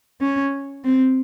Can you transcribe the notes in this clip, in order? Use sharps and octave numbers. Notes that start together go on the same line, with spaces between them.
C#4
C4